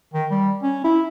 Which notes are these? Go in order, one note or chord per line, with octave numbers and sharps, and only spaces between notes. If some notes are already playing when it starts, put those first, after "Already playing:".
D#3
G3
C#4
E4